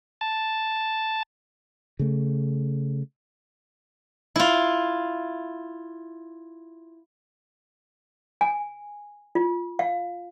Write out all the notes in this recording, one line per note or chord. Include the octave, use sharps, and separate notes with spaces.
A5
C#3 A3
E4 F4
G#5
F4
F5